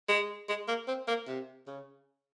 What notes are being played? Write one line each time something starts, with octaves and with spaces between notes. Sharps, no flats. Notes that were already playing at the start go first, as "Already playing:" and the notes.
G#3
G#3
A#3
C4
A#3
C3
C#3